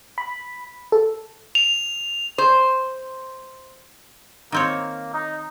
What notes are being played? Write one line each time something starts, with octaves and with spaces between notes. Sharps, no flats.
B5
A4
F7
C5
D#3 A#3 C4 C#5
D#4